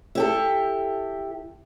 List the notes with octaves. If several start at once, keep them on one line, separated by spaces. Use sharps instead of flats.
E4 G4 A4